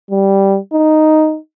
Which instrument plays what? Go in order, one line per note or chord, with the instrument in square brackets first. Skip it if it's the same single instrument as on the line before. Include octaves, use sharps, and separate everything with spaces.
[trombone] G3
D#4